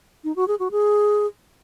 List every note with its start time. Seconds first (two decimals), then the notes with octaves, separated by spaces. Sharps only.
0.24 D#4
0.36 F#4
0.48 G#4
0.59 F#4
0.71 G#4